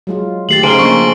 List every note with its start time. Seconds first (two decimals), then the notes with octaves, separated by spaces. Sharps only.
0.07 F#3 G#3 F4
0.49 D#3 A3 G4 A6 C7 F#7
0.63 C#3 D#4 G#4 C5 F5 D7 G7
0.79 F3 A#3 D4 C#6